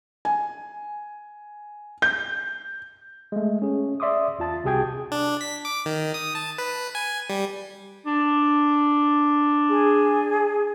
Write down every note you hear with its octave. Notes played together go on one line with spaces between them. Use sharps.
G#5
G6
G#3 A3
C#4 G#4
D5 E5 C6 D6 D#6
E2 F4 A5 A6
C2 C3 F#4 G#4 G5 G#6
D4
B6
D6
D#3
D#6
A5
B4
G#5
G3
D4
G#4